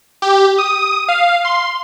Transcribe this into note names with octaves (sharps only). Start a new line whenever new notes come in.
G4
D#6
F5
C6